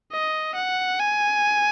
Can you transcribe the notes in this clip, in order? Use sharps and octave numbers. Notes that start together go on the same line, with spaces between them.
D#5
F#5
G#5